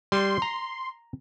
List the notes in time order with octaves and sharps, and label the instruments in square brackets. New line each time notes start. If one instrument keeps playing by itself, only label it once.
[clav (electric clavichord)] G3 [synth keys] C6
[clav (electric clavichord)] A#5